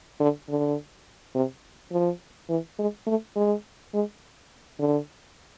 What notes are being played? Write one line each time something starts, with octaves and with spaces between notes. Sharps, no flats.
D3
D3
C3
F3
E3
G#3
A3
G#3
G#3
D3